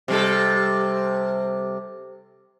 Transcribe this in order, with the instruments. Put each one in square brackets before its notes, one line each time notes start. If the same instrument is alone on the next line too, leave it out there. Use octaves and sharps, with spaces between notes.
[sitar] C3 G3 A4